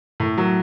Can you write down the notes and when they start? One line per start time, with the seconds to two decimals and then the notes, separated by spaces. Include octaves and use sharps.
0.20 A2
0.37 F#3